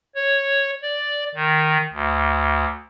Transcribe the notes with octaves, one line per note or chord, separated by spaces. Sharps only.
C#5
D5
D#3
D2